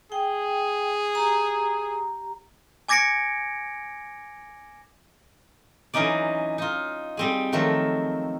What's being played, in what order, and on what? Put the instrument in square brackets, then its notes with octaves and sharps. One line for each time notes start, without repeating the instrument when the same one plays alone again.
[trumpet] G#4 [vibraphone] G5
[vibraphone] G4 A#5
[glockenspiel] G#5 D6 G#6 A#6 C#7 D7
[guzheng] E3 F#3 C#4 D#4 D5
D#4 F4
G3 C4 G#4
D#3 F3 F#3 A3 A4